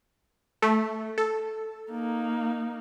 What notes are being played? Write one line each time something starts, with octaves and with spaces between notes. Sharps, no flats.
A3
A4
A#3 D#4